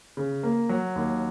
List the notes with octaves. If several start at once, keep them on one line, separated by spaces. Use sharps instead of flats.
C#3
A#3
F#3
D#2